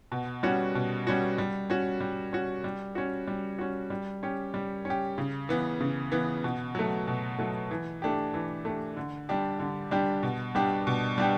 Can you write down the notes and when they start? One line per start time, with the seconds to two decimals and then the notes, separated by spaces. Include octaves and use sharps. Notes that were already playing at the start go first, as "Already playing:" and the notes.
0.12 B2
0.43 G3 C#4 F#4
0.75 B2
1.07 G3 C#4 F#4
1.38 G3
1.70 C#4 F#4
2.01 G3
2.33 C#4 F#4
2.64 G3
2.95 C#4 F#4
3.28 G3
3.59 C#4 F#4
3.90 G3
4.23 C#4 G4
4.54 G3
4.85 C#4
4.90 G4
5.18 C#3
5.49 E3 B3
5.80 C#3
6.12 E3 B3
6.44 B2
6.75 F#3 A3
7.08 B2
7.38 F#3 A3
7.71 E3
8.02 A3 D4 G4
8.34 E3
8.65 A3 D4 G4
8.97 D3
9.29 G3 D4 G4
9.59 D3
9.91 G3 D4 G4
10.23 B2
10.55 G3 D4 G4
10.87 B2
11.18 G3 D4 G4